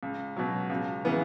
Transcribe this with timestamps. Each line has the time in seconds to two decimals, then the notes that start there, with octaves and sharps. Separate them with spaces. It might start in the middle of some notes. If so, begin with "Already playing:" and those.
0.03 C#2
0.37 B2 F#3
0.70 C#2
1.05 C#3 E3 B3